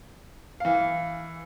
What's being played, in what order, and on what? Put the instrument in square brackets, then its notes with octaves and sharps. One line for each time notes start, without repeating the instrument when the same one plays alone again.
[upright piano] E3 F5